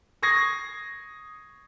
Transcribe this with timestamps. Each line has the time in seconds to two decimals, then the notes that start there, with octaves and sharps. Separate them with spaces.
0.22 C#6 D#6 G#6 A#6 C7